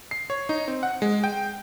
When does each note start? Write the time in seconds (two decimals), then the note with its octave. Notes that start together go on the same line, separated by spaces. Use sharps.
0.11 C7
0.30 C#5
0.49 D#4
0.68 C4
0.83 F#5
1.02 G#3
1.24 G5